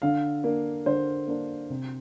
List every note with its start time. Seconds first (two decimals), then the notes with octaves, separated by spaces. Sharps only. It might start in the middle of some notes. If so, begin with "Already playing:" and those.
0.02 D3 F5
0.44 A#3 D4
0.86 D3 C5
1.28 A#3 D4
1.70 C3